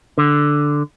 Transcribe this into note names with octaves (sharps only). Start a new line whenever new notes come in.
D3